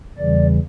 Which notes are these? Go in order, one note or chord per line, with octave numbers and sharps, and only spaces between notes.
E2 C#3 E3 G3 D5